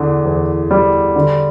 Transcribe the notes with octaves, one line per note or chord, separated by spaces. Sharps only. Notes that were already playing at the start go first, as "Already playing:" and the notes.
Already playing: E2 D3
E2
G3
D3